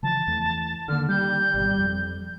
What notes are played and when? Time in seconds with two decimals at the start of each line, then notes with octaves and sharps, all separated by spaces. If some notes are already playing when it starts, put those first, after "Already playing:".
0.03 C#3 E3 F3 A5
0.27 E2 E3 A3
0.88 D3 D#3 A#3 F6
1.08 G3 G6
1.54 G#1 B2
1.79 F2